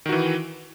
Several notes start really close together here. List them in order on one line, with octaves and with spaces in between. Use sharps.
D#3 F#4 E3